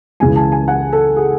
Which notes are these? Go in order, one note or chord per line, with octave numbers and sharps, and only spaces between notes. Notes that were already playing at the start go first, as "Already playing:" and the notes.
C#2 C#3 E3 G#3 G#5
A5
G#5
F#5
A4
G#4